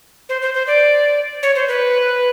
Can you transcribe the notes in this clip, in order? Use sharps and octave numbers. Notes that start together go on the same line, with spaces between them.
C5
C5
C5
D5
C#5
C5
B4